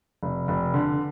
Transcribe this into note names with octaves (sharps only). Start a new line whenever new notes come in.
F1
F1
D3